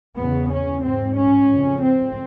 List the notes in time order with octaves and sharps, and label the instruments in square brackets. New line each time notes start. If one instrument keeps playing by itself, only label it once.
[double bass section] E2 C#3 B3
C#4
G#2 C4
C#4
F2 C#3
C4